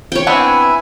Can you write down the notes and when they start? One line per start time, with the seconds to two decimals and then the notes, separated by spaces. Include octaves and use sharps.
0.12 C#5 G5
0.27 B3 C4 D4 E4 E5 G#5